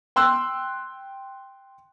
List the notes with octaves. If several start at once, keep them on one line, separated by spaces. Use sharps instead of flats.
G5 C6 E6 F#6